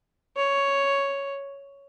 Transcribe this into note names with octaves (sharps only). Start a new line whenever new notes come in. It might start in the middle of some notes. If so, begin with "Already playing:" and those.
C#5